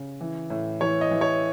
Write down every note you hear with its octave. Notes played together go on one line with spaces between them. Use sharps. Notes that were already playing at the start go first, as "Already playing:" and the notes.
Already playing: C#3
E3
A2
E3 C#5
D#5
E3
C#5